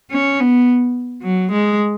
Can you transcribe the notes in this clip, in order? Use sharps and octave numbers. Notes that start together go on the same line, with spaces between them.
C#4
B3
F#3
G#3